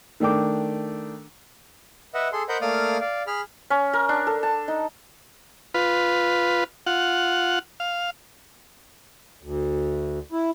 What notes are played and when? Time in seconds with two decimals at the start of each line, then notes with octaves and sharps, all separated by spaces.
0.20 D#3 A3 D4 G5 D6
2.14 B4 D#5 E5 F#5
2.33 G#4 A4 C6
2.49 A#4 C5 D#5 F#5 B5 G6
2.62 A3 A#3 D5 F5 D#6 F6
3.01 D5 F5
3.27 G#4 B5 F6
3.70 C#4
3.93 A#4
4.09 D4
4.27 A4
4.43 A5
4.68 D#4
5.74 F4 B4
6.86 F4 F#5
7.80 F5
9.43 D2
10.32 E4